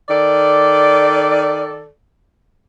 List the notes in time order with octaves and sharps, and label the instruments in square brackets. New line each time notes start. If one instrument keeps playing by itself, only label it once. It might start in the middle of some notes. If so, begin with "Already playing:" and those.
[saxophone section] D#3 A4 D5